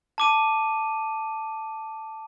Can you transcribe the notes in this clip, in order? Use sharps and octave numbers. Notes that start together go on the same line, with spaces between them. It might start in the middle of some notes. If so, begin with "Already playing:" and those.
A5 D6 D#7